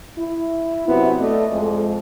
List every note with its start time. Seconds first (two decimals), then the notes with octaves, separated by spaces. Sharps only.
0.19 E4
0.89 F#2 C3 B3 C4 E4 F#4
1.19 A3 D5 D#5
1.51 F2 G#3